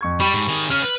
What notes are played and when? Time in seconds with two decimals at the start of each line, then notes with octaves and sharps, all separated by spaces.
0.01 F2 C#6 G#6
0.20 G3 G4 B5 C#6
0.33 G#2
0.48 D#3 G#4
0.70 C#3 C#4 F6
0.82 B4